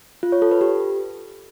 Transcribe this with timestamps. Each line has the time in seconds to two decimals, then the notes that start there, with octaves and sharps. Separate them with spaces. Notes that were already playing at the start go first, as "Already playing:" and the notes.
0.23 F4
0.32 C#5
0.42 A4
0.51 B4
0.61 G4